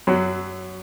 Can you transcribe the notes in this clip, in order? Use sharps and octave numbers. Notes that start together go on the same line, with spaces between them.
F#2 F#3